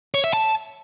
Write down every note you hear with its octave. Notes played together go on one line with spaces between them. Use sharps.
C#5
E5
A5